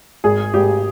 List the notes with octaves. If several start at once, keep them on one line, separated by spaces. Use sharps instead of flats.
G#1 G#4
G#1 G4